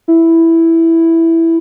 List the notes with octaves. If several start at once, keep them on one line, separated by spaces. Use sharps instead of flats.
E4